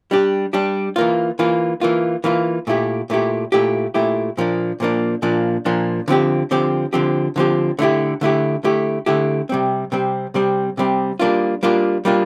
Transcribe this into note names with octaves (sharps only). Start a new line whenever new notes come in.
G3 D4 G4
G3 D4 G4
E3 A#3 F4
E3 A#3 F4
E3 A#3 F4
E3 A#3 F4
A#2 A3 E4 G4
A#2 A3 E4 G4
A#2 A3 E4 G4
A#2 A3 E4 G4
A#2 F3 A#3 D4
A#2 F3 A#3 D4
A#2 F3 A#3 D4
A#2 F3 A#3 D4
D3 F3 C4 G4
D3 F3 C4 G4
D3 F3 C4 G4
D3 F3 C4 G4
D3 A3 E4 G4
D3 A3 E4 G4
D3 A3 E4 G4
D3 A3 E4 G4
C3 G3 C4
C3 G3 C4
C3 G3 C4
C3 G3 C4
G3 A#3 D4 F4
G3 A#3 D4 F4
G3 A#3 D4 F4